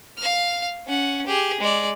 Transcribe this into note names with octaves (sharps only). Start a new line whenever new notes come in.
F5 F6
C#4 F#5
G4 G#4
G#3 D5